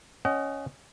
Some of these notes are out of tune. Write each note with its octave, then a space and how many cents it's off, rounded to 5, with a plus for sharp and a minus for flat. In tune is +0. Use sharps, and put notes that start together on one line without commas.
C#4 +0 D#5 +0 F#5 +40